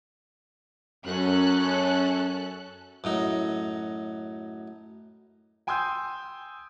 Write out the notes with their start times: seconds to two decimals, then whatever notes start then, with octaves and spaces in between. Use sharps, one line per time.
1.06 F#2 C#4 A4 F#6
3.04 F#2 A2 D#4
5.67 G5 G#5 C6 D#6 E6 G6